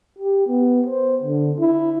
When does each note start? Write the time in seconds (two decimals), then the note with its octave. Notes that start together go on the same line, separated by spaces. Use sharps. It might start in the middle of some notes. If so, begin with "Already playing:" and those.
0.19 G4
0.48 B3
0.87 C5
1.23 D3
1.60 E4